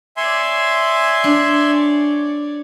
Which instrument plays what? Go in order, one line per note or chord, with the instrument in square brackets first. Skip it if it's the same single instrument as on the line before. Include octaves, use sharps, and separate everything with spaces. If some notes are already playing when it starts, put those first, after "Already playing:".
[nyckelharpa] C#5 D5 [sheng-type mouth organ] E5 G#5 C6
[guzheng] D4